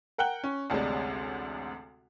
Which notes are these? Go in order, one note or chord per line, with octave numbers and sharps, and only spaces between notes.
A#4 F#5 G5 F#6 G7
C#4
A1 D2 C3 G3 G#3